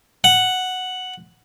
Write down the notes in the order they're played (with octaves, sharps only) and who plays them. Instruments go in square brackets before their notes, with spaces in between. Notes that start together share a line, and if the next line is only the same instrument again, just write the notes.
[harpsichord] F#5